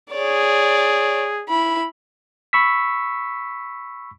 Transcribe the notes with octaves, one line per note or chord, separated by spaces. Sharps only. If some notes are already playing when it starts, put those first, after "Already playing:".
G#4 C#5 D5
E4 B5
B5 C#6 E6 B6